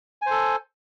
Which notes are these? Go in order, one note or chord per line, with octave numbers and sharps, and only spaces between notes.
A4 C5 G#5